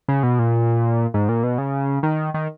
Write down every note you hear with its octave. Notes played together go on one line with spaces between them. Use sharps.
C#3
B2
A#2
G#2
A#2
B2
C#3
D#3
D#3